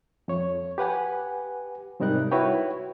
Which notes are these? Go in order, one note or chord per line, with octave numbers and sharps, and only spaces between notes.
F2 C#5
G4 B4 F#5 G#5
G#2 C3 G3 D#4 A#4 F#6
E4 F#4 B4 C#5 G5